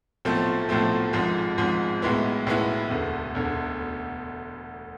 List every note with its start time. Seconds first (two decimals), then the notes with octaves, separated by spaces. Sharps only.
0.25 B1 A2 F3 A3 C4
0.69 B1 A2 F3 A3 C4
1.13 G#1 G#2 F3 G#3
1.58 G#1 G#2 F3 G#3
2.02 B1 A2 G#3 B3 E4
2.46 B1 A2 G#3 B3 E4
2.90 E1 D2 D3
3.35 E1 D2 D3